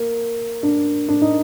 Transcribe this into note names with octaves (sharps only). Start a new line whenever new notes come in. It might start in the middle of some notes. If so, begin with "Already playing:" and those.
Already playing: A#3
D4
D4
D#4